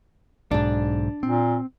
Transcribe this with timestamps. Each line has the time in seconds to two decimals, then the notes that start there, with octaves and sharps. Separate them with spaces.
0.51 B1 G#2 D4
1.23 A#2 C4